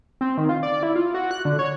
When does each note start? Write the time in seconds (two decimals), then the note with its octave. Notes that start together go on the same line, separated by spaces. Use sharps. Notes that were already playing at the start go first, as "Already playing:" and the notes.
0.21 C4
0.38 D#3
0.49 F4
0.63 D5
0.83 E4
0.95 F4
1.14 F#4
1.31 F#6
1.45 D3
1.59 C#5